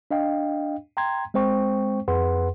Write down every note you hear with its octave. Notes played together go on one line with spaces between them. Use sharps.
D4 D#5 F5 G5
G5 A#5 C6 G#6
G#3 C4 C5 G5 C#6
F2 G#4 B4 F#5 C6